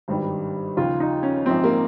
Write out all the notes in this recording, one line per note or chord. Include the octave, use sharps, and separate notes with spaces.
G#1 G2 D#3 G3
D#2 C#3 F3 F4
D#4
C#4
A#1 G#2 F3 C4
A#3